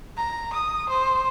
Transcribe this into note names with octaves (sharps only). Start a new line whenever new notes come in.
A#5
D#6
C5